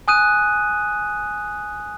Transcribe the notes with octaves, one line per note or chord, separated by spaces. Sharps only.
G#5 D#6 F#6 D#7